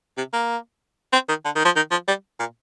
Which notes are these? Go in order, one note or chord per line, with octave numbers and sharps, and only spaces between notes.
C3
A#3
C4
D#3
D3
D#3
F3
D#3
F3
G3
A#2